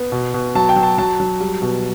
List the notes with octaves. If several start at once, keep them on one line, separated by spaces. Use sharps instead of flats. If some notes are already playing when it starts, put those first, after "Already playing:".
Already playing: B3
B2
B2
F#3 A5
G5
F#3
A5
F#3 A5
F#3
G3
B2